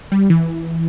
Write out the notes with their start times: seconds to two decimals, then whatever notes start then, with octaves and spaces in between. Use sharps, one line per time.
0.12 G3
0.30 E3